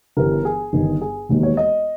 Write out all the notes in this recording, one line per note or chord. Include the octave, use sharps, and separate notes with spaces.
G1 G2 E3 G3 A#4
G#4
G1 G2 D#3
G#4
E1 D#2 D#3
C#5
D#5